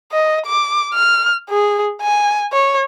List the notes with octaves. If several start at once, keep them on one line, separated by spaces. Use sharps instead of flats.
D#5
D6
F6
G#4
G#5
C#5